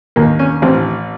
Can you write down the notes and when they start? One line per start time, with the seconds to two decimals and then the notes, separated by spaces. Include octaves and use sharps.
0.16 D#2 A#3
0.39 C#4
0.62 A1 C4